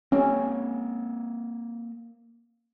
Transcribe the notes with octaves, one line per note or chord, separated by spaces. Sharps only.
A#3 C4 C#4